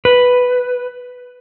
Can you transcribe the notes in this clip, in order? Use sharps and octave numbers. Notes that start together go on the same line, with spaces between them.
B4